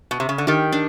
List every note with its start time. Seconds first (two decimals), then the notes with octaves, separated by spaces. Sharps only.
0.11 B2
0.20 C3
0.29 C#3
0.38 D3
0.47 D#3 G4
0.72 D4